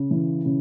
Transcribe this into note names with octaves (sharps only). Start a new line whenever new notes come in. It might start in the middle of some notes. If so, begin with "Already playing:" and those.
Already playing: C#3
E3
C#3